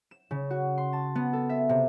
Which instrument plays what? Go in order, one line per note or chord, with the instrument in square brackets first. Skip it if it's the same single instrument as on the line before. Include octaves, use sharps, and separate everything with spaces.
[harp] E7
C#3
F#4
C6
A5
B3
A4
E5
C3